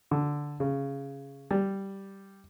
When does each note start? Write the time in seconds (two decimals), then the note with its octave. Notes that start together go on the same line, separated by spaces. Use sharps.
0.11 D3
0.60 C#3
1.51 G3